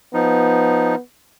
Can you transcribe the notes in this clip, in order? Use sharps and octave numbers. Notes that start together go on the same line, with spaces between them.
F3 B3 D#4